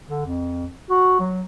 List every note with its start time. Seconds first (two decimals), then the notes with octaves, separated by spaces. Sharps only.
0.09 D3
0.25 F2
0.90 F#4
1.20 F#3